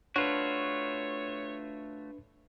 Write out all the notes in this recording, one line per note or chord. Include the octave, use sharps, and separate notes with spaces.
A3 D4 F4 F#4 B4 C#5